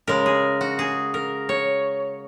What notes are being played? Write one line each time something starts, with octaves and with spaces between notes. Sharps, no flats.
C#3 G#3 A#4
G#4
F#4
G#4
A#4
C#5